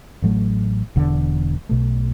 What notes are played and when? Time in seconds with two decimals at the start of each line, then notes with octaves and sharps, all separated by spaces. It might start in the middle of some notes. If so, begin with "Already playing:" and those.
0.22 A1 A2 F#3 A3
0.96 E1 E2 D3
1.69 B1 B2 A3